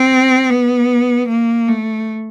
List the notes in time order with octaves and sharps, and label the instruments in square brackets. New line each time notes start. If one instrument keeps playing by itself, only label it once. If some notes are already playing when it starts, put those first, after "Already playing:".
Already playing: [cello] C4
B3
A#3
A3